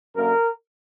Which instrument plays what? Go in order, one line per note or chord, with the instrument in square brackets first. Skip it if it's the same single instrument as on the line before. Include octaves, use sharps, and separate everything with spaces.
[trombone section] F#2 D3 A#3 A#4